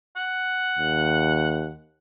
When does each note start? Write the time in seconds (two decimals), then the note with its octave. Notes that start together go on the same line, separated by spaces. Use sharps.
0.16 F#5
0.78 D#2